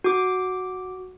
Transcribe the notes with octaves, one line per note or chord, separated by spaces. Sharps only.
F#4 D6